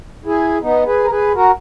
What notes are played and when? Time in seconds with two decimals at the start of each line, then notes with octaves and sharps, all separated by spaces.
0.25 E4 G#4
0.62 B3 D#4
0.86 G#4 B4
1.04 A#4
1.10 G#4 B4
1.35 F#4 A#4